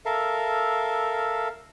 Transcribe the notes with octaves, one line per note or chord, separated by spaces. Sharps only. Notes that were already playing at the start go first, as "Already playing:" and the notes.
A4 A#4 E5 F5